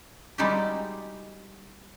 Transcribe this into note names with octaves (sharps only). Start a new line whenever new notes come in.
G3 G#3 D#4 E4 F#4 G4